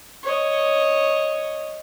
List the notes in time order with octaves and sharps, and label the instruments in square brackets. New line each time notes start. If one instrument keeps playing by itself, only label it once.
[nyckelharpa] C#5 D#5